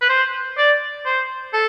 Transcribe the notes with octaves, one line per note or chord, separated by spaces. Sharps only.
B4
C5
D5
C5
A4